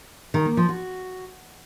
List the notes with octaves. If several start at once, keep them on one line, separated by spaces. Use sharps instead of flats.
D#3
A#3
F3
F#4